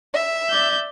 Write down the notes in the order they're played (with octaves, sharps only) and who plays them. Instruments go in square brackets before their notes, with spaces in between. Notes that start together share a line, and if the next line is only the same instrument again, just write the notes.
[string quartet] E5
[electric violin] D5 G6